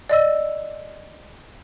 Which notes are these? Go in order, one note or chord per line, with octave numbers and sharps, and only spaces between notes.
D5 D#5 E6